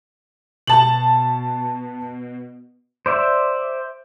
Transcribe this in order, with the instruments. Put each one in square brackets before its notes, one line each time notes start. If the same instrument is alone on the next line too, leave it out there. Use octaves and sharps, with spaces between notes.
[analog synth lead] B2 [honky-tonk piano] A5 F#7
[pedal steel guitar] C5 D5 E5